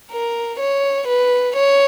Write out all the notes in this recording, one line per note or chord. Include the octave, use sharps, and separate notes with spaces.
A#4
C#5
B4
C#5